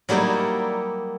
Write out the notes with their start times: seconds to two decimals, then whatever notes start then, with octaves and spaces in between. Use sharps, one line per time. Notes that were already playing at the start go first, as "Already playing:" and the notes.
0.09 F#3 G3 A#3 D#4 E4